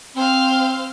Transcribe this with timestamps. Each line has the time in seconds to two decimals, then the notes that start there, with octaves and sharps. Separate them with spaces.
0.16 C4 C5 F5